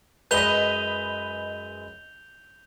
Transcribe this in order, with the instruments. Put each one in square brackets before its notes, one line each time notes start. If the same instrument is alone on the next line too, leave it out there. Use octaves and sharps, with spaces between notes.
[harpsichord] F#2 G#3 [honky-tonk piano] B4 D#5 [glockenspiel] G6 F7 G7